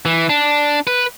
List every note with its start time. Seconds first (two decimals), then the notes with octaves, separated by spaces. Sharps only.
0.05 E3
0.29 D4
0.87 B4